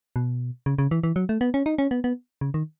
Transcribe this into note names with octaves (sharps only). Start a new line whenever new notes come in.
B2
C#3
C#3
E3
E3
F#3
A3
B3
C#4
D#4
C#4
B3
B3
C#3
D#3